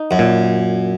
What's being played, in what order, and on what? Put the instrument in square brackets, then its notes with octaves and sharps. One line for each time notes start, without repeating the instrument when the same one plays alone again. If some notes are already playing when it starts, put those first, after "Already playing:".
Already playing: [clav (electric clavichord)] D#4
[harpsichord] F#2
[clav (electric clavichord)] A#2